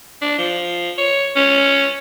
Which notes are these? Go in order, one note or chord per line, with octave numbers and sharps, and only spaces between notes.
D4
F3
C#5
C#4